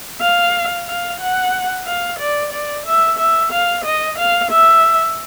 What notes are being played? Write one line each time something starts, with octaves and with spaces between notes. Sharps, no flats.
F5
F5
F#5
F5
D5
D5
E5
E5
F5
D#5
F5
E5